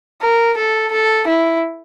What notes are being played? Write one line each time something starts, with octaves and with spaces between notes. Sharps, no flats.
A#4
A4
A4
E4